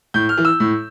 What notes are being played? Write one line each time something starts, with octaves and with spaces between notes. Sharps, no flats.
A2 G6
F6
E3
E6
A2